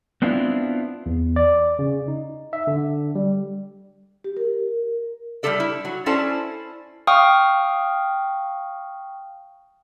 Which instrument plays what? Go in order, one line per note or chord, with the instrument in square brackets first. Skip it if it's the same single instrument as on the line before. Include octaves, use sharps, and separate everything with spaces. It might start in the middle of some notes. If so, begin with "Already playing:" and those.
[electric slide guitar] B3 C4 D4 E4 F4
[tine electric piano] E2
D5
C#3
D#4
E5
D3
G3
[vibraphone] G4
A#4
[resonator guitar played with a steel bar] G3 A3 B3 G4 A4 D5
E4
F#3
C#4 E4 A4 C5 D5 A5
[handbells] F5 G5 C#6 D#6 F6